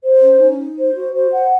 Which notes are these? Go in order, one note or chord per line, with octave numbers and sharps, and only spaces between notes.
C5
C#4
D#4
D#4
C5
F#4
C5
F#5